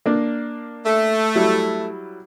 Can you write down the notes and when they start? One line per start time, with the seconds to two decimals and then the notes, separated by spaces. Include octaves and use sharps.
0.06 A#3 D4
0.85 A3
1.35 F#3 G3 E4